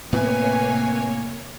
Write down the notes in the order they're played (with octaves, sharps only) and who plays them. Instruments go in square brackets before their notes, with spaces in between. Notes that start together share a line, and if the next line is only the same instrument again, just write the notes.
[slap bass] A2 B3 [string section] C3 G#5 [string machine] A#3 C#5 [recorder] B4